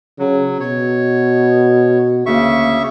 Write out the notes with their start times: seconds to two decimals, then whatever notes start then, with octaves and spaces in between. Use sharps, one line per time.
0.19 C#3 F#3
0.60 B2 C#5
2.26 D2 C#3 A#3 E5 C#6